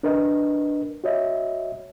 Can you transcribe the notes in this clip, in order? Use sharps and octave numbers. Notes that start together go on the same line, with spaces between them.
D4 A#4 B4 D#5
F#4 C#5 D#5 E5